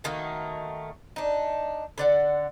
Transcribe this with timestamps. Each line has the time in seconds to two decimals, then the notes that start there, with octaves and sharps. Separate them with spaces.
0.04 B2 D#3 A3 A#3
1.16 D4 D#4
1.98 D3 D5 F#5